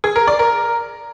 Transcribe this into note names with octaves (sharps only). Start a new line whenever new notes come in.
G#4
A#4
D5
A#4